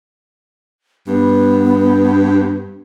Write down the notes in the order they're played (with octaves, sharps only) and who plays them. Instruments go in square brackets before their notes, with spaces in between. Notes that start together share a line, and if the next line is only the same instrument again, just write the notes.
[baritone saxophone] G2 [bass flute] B3